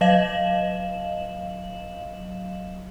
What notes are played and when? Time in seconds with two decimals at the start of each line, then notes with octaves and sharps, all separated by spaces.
0.01 F#3 D#5 F5 E7 F#7